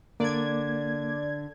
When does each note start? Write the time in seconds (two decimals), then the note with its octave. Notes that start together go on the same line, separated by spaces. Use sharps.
0.20 D3 A#3 D5 G#6